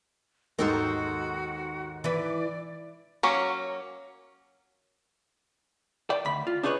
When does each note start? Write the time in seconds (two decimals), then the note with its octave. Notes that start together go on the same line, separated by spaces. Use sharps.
0.59 D#2 G#2 D#3 D#4 F#4 A4 A#4 C5
2.04 E3 B4 D5
3.23 F#3 A#3 C#4
6.10 D5 G5
6.25 D2 B5
6.47 F4
6.63 D4 D#4 G#4 B4 C#5